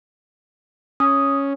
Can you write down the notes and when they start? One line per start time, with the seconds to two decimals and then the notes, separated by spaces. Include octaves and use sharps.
1.00 C#4 D#6